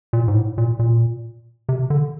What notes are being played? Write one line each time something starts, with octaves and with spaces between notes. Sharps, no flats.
A#2
G#2
A2
A#2
A#2
C3
D3